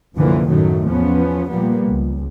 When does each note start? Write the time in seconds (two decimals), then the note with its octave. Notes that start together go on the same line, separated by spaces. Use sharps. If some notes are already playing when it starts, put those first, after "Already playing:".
0.16 C2 F#2 D3 E3 F3 A#3
0.47 F#2 A2 D#3 F#3 A3
0.86 E2 F3 B3 C#4
1.49 A#2 F3 G3 A#3 B3
1.87 C#2